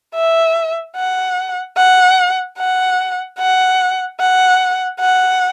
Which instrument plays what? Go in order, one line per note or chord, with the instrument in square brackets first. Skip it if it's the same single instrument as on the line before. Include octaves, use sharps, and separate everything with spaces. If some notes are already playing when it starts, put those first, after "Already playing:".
[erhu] E5
F#5
F#5
F#5
F#5
F#5
F#5